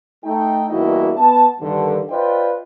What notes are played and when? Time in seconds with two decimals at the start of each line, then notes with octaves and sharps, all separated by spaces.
0.24 A3 D#4 G5
0.70 E2 G2 A#3 E4 F#4 D#5
1.17 B3 A5
1.60 G2 D3 D#3
2.10 F4 B4 C5 D5 D#5 G5